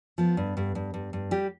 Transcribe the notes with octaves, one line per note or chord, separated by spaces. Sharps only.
F3 B3
G2
G2
G2
G2
G2
G3 G4